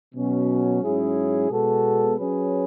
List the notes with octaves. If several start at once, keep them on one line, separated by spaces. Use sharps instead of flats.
B2 F#3 C#4
G#2 F#3 C#4 E4 G#4
B2 G#3 B3 F#4 A4
F#3 C#4 G#4 B4